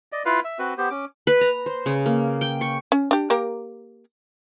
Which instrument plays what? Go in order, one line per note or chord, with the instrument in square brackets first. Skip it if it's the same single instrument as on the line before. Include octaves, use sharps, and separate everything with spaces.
[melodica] D5 D#5
E4 F4 B4 F5
E5
C4 F#4 B4
B3 G4 C5
C#4 D6
[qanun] B4
A#5
C5
C#3
A#3
G5
C#6
[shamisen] C#4
D4 G4
A#3 G4 A#4